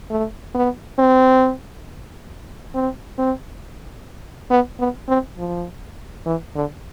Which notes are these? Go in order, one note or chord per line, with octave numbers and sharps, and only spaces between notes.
A3
B3
C4
C4
C4
B3
B3
C4
F3
E3
D3